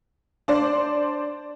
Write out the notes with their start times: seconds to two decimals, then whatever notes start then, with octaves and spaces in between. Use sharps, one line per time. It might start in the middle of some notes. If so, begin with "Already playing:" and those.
0.48 D4 C5 D5